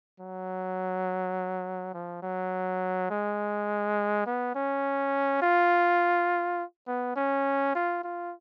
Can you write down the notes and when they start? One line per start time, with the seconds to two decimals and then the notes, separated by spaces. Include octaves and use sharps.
0.20 F#3
1.94 F3
2.22 F#3
3.10 G#3
4.26 B3
4.55 C#4
5.42 F4
6.87 B3
7.16 C#4
7.75 F4
8.03 F4